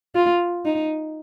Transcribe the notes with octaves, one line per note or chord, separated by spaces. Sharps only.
F4
D#4